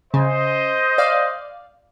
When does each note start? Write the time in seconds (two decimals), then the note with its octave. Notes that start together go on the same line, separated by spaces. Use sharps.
0.14 C#3 C5 D#5
0.98 D5 F5